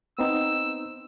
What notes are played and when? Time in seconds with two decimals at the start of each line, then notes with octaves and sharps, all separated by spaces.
0.19 B3 C4 D#4 E6